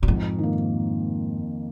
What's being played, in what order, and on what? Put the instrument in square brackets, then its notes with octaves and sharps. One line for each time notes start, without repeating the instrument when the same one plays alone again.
[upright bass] A#2
[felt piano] F2 [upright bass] G#2
[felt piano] D#3 A#3